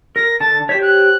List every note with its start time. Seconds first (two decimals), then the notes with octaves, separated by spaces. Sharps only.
0.16 A#4 A#6
0.40 D3 A5 A6
0.69 G4 C5 C#5 B6
0.82 F#6